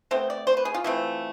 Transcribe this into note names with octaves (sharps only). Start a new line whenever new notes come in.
B2 A3 C4 C5
D5
C5
B4
G#4
F4
E3 A3 C4